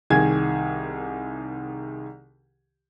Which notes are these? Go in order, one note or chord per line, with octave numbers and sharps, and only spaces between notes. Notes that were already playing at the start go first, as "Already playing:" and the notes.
C2 D#3 G#4 G#5 G#6